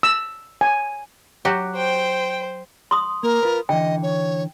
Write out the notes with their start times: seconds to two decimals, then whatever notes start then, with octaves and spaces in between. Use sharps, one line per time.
0.03 E6
0.61 G#5
1.45 F#3 F#4 G4
1.76 C5 G5
2.91 C6 D#6
3.23 A#3 A#4
3.43 F4 B4
3.69 D3 E3 D#5 G5
4.03 C#5